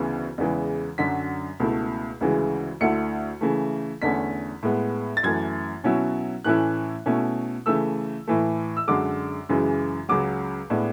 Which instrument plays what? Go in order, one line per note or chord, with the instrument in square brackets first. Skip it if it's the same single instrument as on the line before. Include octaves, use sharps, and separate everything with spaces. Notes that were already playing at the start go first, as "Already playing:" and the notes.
Already playing: [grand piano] D2 C#3 E3 B3
E2 C#3 E3 G#3
F#2 D3 F#3 B6
C#2 B2 A3 E4
D2 C#3 E3 G#3
D2 D3 A3 E4 C#7
C#3 E3 A3
E2 D3 A3 C#4 B6
A2 G#3 B3
A6
F#2 E3 A3 G#6
B2 F#3 C#4 E4
A2 E3 A3 C#4 E4 F#6
B2 A3 C#4 E4
C#3 E3 A3 E6
A2 E3 A3
E6
F#2 D3 G#3 D6
F#2 C#3 E3 G#3
C#2 C#3 F#3 D6
A2 G#3 B3 D4